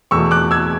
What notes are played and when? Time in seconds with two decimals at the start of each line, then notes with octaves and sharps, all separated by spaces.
0.11 E2 B2 A3 C#6 E6
0.31 D6 F#6
0.51 E6 G#6